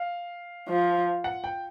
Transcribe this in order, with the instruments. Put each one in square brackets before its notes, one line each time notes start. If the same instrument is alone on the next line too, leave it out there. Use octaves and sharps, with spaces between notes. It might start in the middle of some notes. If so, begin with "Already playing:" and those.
Already playing: [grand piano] F5
[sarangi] F3
[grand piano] F#5
G5